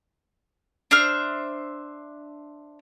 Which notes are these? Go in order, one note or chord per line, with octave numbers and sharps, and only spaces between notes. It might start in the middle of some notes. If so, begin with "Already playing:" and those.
D4 C5 E5 F6